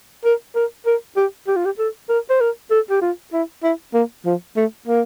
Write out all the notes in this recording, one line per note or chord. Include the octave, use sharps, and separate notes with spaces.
A#4
A#4
A#4
G4
G4
F4
G4
A4
A#4
C5
A#4
A4
G4
F4
E4
E4
A#3
F3
A3
A#3